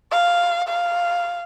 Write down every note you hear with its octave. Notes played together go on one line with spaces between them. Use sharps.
F5
F5